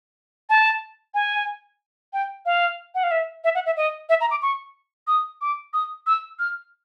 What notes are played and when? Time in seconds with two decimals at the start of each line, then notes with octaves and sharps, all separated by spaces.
0.50 A5
1.14 G#5
2.13 G5
2.46 F5
2.95 F#5
3.03 F5
3.11 E5
3.44 E5
3.55 F#5
3.66 E5
3.77 D#5
4.09 E5
4.21 A#5
4.31 D6
4.42 C#6
5.07 D#6
5.41 D6
5.73 D#6
6.07 E6
6.39 F6